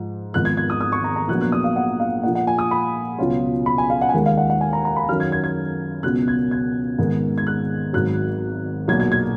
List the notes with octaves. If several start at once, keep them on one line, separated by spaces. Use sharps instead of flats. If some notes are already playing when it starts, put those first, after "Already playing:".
Already playing: G#2 F3
G#1 G#2 F3 B3 F#6
G#6
G#6
D#6
D#6
C#6
A#5
A#5
A#1 A#2 F#3 B3 F#6
F#6
D#6
F5
F#5
F5
A#2 F3 A#3 F#5
F#5
G#5
D#6
B5
C#2 B2 F#3 C#4 F4
B5
G#5
F5
F#5
G#5
D#2 D#3 G#3 F#5
F5
F#5
F#5
G#5
A#5
A#5
B5
F#2 D#3 F#3 F6
G#6
G#6
G#6
C#2 B2 F#3 F#6
G#6
G#6
G#1 G#2 D#3 G#3 B3
G#6
F#6
G#1 G#2 F#3 F#6
B1 A#2 F#3 A#3 G#6
G#6
G#6